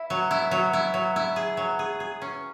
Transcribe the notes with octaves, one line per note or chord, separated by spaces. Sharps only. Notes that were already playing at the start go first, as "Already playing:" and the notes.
Already playing: E4
F#3
E4
F#3
E4
F#3
E4
G#4
F#3
G#4
G#4
C#4